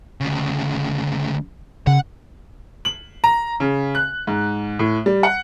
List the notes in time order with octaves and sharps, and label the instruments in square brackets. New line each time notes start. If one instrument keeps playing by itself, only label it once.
[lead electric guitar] D2 C#3
[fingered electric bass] C#3 [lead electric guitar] F#5
[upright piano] F#7
A#5
C#3
F#6
G#2
A2
G3
F#5